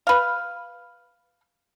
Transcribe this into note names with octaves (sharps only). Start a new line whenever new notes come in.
B4 F5